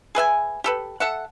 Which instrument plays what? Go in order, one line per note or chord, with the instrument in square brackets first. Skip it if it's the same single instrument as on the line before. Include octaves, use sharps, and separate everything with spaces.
[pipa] G#4 B4 E5 G#5
G4 A4 B4
A4 E5 F#5